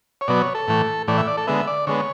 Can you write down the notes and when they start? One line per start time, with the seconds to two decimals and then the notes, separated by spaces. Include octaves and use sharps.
0.21 C#5
0.28 B2 F#3 B3 D5
0.41 C#5
0.55 A4
0.68 A2 E3 A3
1.07 A2 E3 A3 D5
1.18 E5
1.27 D5
1.37 A4
1.47 D3 G#3 B3 E5
1.67 D5
1.87 D3 G#3 B3 C#5